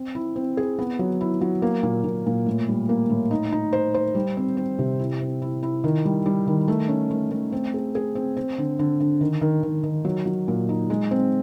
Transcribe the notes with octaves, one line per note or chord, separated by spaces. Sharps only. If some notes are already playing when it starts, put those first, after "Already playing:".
Already playing: C4
E4
C4
G#4
B3
F#3
E4
F#3
A#3
A#2
A#2
A#2
A2
G3
A#3
A2
D#4
D#4
C5
C5
G3
C4
C4
C3
E4
C4
E4
E4
D#3
G3
G3
D#3
A3
C#4
A3
A3
C4
G#4
G#4
C4
C4
D3
D3
D3
D#3
D#3
D#3
D#3
F#3
F#3
A#2
D#4
G#3
C4